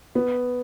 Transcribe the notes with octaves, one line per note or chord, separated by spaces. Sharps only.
B3